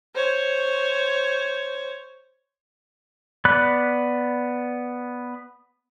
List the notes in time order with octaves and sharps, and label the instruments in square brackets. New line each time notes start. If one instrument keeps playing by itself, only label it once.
[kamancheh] C5 C#5
[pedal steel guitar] B3 D5 B5 F#6